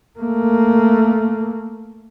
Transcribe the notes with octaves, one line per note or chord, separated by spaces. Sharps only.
A3 A#3